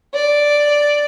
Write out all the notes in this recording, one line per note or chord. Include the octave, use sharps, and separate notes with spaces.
D5